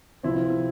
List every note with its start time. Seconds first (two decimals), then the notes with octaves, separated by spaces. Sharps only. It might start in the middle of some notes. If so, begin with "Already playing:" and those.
0.23 C3 F3 C4 E4